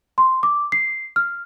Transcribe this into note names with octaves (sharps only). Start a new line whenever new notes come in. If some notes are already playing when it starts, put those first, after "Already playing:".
C6
D6
C7
F6